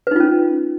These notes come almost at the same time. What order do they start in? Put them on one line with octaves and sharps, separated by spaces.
B4 D#4 F4 C#4